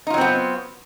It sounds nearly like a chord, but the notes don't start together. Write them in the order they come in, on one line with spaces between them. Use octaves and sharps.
D#4 F4 F#3 C4 B3